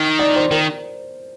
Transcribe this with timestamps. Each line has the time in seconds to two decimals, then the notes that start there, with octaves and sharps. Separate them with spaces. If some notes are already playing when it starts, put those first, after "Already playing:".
Already playing: D#3
0.19 D5
0.36 C5
0.51 D#3 A#4